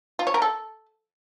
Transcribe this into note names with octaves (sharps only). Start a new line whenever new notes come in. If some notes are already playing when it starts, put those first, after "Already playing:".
F4
C#5
A#4
A4